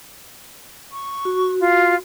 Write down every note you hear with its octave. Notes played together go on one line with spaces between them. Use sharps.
C#6
F#4
F4